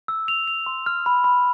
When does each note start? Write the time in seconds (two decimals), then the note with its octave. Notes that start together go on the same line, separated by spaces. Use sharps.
0.08 E6
0.28 F7
0.48 F7
0.66 C6
0.86 F6
1.06 B5
1.24 B5